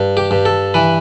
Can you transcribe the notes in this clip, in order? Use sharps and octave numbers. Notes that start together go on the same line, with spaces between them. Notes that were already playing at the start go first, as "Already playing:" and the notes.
Already playing: G2
G4
G2
A4
E3 B4